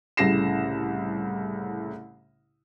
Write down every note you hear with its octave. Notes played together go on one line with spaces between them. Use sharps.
C2 A2 C#3 A#6 C7 E7